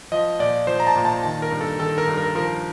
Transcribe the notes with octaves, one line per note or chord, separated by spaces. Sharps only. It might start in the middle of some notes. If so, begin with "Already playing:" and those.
F3 D#5
A#2 D5
F3 C5
A#5
A5
A#2
A5
D#3 A5
A#4
G2
A4
D#3 A4
A#4
G2
A#4
F3 A#4